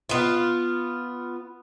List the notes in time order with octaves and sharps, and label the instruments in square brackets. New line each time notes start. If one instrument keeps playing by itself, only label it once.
[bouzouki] B3 F4